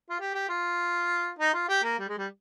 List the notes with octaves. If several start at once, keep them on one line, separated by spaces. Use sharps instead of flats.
F4
G4
G4
F4
D#4
F4
G4
A#3
G3
G#3
G3